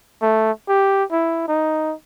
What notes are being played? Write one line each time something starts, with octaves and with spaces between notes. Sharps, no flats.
A3
G4
E4
D#4